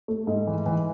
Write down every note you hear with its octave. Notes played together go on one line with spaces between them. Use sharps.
A3
G#2
E3
E3